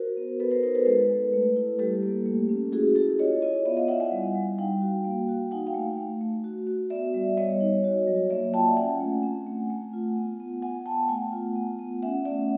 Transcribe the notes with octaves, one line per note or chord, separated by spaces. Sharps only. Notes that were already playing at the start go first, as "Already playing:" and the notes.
Already playing: F#4 A#4 C5
B3
B3 A4 B4
A#4 C5
D#4 A#4 C5
A4 B4
G#3 A4 B4
G#3
A3
E4
G3 G4 A4
A#3
A3
C#4
E4 F#4 G#4
E4 G4 A4
F4 C#5 D#5
F4 C#5 D#5
B3 D5 E5
D#5 F5
E4 E5 F#5
F#5 G#5
G3
G3
D#4 F5 G5
F#4
A#3
F#4
D#4 F#5 G#5
F5 G5
A3
A3
A3
F#4
F#4
B3 D5 E5
G3
G3 C#5 D#5
D#4
F#4
F#3
A#3 D5 E5
F4 G5 A5
C#4 F#5 G#5
A3
C4
A3
A3
F4
B3
B3
B3 F#5 G#5
B3 G5 A5
A3 F#5 G#5
F4
B3
B3
C#4 E5 F#5
A3 D5 E5